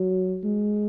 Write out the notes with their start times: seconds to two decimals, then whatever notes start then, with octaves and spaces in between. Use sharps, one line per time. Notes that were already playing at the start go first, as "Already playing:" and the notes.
Already playing: F#3
0.44 G#3